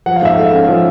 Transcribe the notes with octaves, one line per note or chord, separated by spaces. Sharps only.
F3 F#5
F5
G#2 E5
A3 F5
C#4
F3